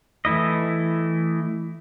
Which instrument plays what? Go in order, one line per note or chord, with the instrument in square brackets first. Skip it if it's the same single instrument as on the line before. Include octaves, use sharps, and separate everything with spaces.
[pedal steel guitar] E3 A3 E4 D#5